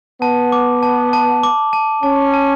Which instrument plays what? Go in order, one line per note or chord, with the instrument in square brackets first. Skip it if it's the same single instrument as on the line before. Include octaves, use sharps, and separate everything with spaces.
[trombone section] B3 [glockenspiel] A5
[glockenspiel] D6
A5
A5
D6
A5
[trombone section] C#4 [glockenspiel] A5
[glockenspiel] A5